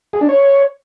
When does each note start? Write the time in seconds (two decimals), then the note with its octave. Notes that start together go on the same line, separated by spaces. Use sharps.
0.13 G#4
0.21 D4
0.29 C#5